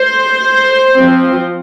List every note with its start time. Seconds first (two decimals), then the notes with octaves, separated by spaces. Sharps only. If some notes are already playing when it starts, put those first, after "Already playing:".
Already playing: C5
0.95 F3 C4